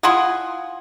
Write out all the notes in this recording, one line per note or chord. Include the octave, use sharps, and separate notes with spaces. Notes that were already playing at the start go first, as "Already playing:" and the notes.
E4 F4 G#4 F#5